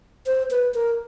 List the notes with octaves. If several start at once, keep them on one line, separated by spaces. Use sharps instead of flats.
C5
B4
A#4